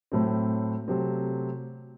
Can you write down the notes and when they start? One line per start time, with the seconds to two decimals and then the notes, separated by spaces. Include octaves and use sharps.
0.12 A2 F#3 A3 C4
0.88 C3 F#3 A3 C4